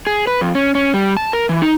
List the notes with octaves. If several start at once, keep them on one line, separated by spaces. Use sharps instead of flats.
G#4
B4
F2
C#4
C#4
G3
A5
A#4
E3
D#4